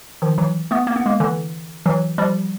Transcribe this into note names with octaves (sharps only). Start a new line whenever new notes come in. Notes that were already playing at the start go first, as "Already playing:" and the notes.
D#3 F3
E3 F#3
A3 B3
A#3
B3
G#3 A#3
D3 E3
E3 F#3
F3 G3